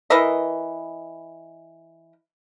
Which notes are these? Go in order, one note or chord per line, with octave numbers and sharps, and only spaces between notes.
E3 A#4 B4 D#5